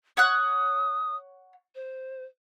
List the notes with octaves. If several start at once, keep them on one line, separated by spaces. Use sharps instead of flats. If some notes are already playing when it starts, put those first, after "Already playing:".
C#5 F#5 D#6 F#6
C5